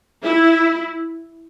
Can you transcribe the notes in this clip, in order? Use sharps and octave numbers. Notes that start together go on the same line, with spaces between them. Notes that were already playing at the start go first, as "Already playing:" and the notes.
E4